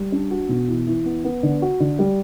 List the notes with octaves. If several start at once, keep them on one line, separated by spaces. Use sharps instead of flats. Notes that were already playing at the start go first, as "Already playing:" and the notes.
Already playing: G3
D4
F#4
B2
E3
E3
B3
B3
D3
F#4
D3
G3